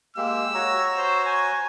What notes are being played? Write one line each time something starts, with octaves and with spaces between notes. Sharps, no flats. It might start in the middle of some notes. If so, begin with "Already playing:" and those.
G#3 A#3 G4 E6
F#4 C#5 A#5
C5
G#5